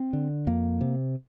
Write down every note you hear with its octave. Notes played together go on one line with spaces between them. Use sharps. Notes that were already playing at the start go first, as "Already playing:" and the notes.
Already playing: C4
D3
F2 A#3
C3